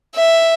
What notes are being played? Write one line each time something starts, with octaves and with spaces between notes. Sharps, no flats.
E5